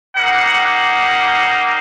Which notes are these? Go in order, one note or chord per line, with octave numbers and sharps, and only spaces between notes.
G3 A#3 D#4 G4 F#5
F#5